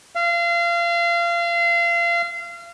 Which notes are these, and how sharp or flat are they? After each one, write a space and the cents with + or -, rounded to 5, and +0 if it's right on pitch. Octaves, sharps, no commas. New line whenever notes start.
F5 -30